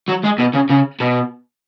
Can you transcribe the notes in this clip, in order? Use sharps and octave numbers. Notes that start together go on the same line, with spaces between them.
F#3
G#3
B2
C#3
C#3
B2